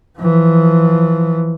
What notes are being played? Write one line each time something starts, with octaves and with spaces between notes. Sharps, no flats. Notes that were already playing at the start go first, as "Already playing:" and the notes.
E3 F3